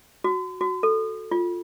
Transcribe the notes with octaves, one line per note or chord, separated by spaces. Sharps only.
F#4
F#4
A4
F4